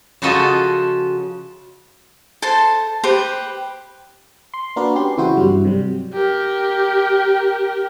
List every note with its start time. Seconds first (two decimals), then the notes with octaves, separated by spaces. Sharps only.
0.22 C#3 F3 F4 F#4 A4 D#5
2.42 A4 C5 A5 C6
3.04 G4 B4 C5
4.54 C6
4.76 A#3 D4 F#4 A#4 B4 D5
4.95 C#4 G4 C6
5.17 C#3 E3 C4 E4 F#4 C5
5.37 G2 F#3 G3
5.65 C3 F#3 G3
6.13 G4 A#4